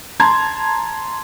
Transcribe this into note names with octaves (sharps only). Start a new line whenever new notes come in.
A5 A#5 C6 G#6